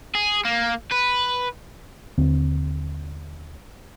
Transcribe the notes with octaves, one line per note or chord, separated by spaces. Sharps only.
G#4
A#3
B4
D#2 D3 C4